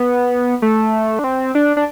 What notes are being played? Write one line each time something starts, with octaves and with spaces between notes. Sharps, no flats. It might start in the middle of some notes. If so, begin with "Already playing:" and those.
Already playing: B3
A3
D4
C4
D4
D4